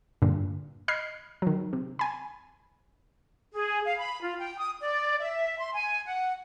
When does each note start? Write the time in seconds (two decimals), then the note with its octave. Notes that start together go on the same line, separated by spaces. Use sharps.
0.22 G2 A#2 D3
0.88 D#5 B5 F6 F#6 G#6 C7
1.42 D#3 F#3
1.73 C3
1.99 G#5 B5
3.52 G#4
3.85 F5
3.98 B5
4.22 F4
4.39 G5
4.58 D#6
4.80 D5
5.20 E5
5.59 C6
5.73 G#5
6.06 F#5